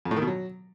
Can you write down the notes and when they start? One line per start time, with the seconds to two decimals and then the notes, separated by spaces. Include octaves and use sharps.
0.05 F2
0.11 A2
0.16 D#3
0.22 B2
0.27 F#3